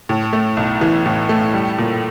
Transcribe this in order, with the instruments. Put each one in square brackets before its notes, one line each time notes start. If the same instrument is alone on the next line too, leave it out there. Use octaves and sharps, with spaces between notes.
[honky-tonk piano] A2
A3
B1
E3
A2
A3
G3
A#2